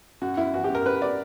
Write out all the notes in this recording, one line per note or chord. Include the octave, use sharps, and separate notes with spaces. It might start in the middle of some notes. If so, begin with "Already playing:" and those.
F#2 F#4
F#2 E4
E3 F#4
G4
F#2
A#4
F#2 B4
D5